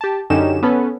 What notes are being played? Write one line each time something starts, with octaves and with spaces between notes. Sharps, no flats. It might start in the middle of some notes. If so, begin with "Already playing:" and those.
G4 A5
F#2 D3 C#4 D#4 G4 E7
B3 C#4 A4 B4